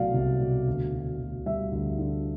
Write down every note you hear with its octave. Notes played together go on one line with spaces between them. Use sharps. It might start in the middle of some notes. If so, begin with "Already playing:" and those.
Already playing: C2 B2 F#3 A3 D5 F5
C2
B2
D2
D3
D2
G3 E5
D2
D3